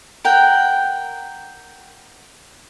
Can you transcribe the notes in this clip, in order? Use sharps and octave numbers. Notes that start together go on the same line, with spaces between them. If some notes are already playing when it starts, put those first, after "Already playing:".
A#4 F#5 G5